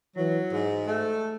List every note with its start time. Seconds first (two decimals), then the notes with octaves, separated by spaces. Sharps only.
0.17 E3 F#3
0.52 G#2
0.88 A3